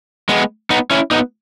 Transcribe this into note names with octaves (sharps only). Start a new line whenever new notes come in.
G#3 B3
B3 D#4
C#4 E4
B3 D#4